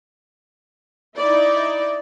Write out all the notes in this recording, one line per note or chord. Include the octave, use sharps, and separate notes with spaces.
D#4 E4 D5